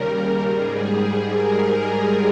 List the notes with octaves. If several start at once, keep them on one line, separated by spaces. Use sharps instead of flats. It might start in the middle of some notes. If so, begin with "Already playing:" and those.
Already playing: D#2 C#3 G3 A#4
G#2 G3 G#4
A#4